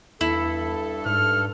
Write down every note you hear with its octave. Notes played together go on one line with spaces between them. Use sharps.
E2 G2 E4 A4
G#2 F6